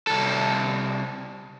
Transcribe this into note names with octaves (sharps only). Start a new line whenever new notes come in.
C2 A4